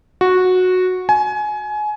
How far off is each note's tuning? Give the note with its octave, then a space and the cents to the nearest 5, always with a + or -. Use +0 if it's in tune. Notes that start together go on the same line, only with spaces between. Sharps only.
F#4 -10
G#5 +25